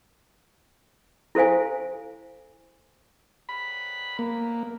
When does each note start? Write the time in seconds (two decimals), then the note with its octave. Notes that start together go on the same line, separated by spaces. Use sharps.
1.35 E4 A4 C5 F5 G#5
3.49 B5
4.19 A#3